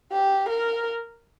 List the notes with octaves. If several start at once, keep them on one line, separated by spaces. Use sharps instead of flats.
G4
A#4